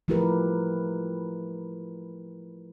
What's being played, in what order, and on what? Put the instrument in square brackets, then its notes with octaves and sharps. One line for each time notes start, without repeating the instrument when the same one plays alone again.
[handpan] F3 A3 E4 G4 A#4 B4